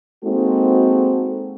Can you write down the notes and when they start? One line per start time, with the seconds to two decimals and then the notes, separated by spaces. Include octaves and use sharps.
0.25 G#3 A#3 C4 D#4 F#4 A4